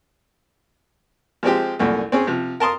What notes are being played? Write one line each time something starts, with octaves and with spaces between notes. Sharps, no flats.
F3 G#3 C4 G4
C2 F#2 A#2 A3
C4 C#4 G#4
C3 F3
A#4 A5 C6 D#6